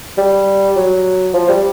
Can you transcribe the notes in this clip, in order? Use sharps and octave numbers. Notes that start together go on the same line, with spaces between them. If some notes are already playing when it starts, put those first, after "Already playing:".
G3
F#3
F3
G3